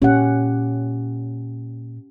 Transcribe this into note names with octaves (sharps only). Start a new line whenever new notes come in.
A#2 C#4 G4 F#5